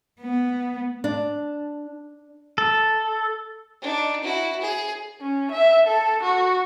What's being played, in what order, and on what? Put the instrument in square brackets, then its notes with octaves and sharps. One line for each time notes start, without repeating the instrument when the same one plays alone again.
[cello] B3
[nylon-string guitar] D4
[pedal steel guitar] A4
[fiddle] D4 D#4
E4 F#4
G#4
[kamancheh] C#4
E5
A4
F#4